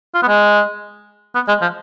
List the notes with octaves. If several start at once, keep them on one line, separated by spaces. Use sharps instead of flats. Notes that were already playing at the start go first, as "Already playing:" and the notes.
F4
B3
G#3
B3
G#3
F3